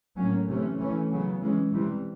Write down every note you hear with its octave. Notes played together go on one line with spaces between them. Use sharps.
A2 F#3 A#3 C#4
C3 E3 A3 C#4
E3 A3 C#4
C#3 F#3 B3
E3 G#3 C#4
C3 E3 G3